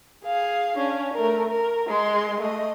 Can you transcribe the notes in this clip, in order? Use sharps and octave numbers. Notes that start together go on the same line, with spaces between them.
G#4 F5
C#4 D4
A3 A#4
A#4
G#3 C6
A3 D#5